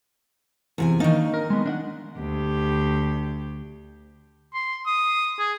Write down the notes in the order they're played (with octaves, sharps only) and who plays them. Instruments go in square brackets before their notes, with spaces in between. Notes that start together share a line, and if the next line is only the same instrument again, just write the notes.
[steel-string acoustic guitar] E2 C3 G#5
[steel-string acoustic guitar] D#3 D#4 [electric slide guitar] A#3 D4
[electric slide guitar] A#4
G#3 B3
D4 D#5 F#5
[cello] D2 G4
[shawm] C6
D#6
G#4